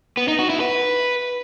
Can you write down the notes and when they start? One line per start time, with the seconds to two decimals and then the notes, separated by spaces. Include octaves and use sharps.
0.17 B3
0.28 D#4
0.39 F#4
0.50 E4
0.60 B4